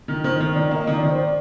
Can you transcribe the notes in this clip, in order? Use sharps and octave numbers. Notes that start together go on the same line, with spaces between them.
D#3
D#3 C5
D#3
D#3 D5
A#3
D#5
D#3
D5
D#3
C5
D5